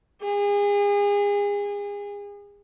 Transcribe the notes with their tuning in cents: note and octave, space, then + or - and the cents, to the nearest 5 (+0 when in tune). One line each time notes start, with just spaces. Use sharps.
G#4 -35